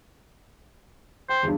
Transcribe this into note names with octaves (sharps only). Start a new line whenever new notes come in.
C5 G5
E2 G2